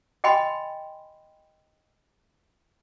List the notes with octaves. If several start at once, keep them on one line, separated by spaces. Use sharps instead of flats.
D#5 G5 G#5 B5 C6